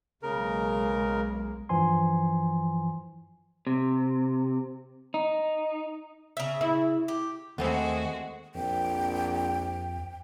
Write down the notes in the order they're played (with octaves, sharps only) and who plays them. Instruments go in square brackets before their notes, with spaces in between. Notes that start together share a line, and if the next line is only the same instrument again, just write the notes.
[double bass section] B1 G#3 A#3 [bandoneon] C#3 A#4
[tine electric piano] G2 E3 F3 G#5 C6
[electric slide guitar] C3
D#4
[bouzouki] C#3 E5
[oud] E4
[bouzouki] G4
[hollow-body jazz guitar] D#2 [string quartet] D#3 G#3 F#4 [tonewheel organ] A3 [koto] B3 C4 A4
[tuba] A#1 [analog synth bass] F2 [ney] G5